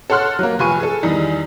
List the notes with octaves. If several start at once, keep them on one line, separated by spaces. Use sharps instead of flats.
A4 C#5 F#5 C6 F6 F#6
F#3 A#3
F1 F4 B4 G#5 C#6 D#7
G#4 A4
E2 D#3 E3 G3 D#4